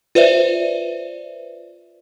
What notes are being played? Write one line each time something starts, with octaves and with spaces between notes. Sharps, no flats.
F4 B4 C5 D5 E5